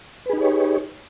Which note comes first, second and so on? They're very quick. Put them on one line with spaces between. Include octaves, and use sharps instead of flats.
B4 G#4 D#4 G4 C#5